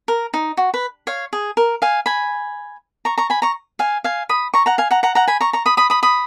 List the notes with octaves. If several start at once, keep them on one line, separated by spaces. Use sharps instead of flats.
A#4
D#4
F#4
B4
C#5 F5
G#4
A#4
F5 G#5
G#5 B5
A#5 C#6
A#5 C#6
G#5 B5
A#5 C#6
F5 G#5
F5 G#5
B5 D#6
A#5 C#6
F#5 A#5
F5 G#5
F#5 A#5
F#5 A#5
F#5 A#5
G#5 B5
A#5 C#6
A#5 C#6
B5 D#6
B5 D#6
B5 D#6
B5 D#6